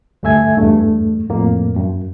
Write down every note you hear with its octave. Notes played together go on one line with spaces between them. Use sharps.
D2 G2 A3 E5 G#5 G#6
E2 G2 A3
F2 A2 A#3
F#2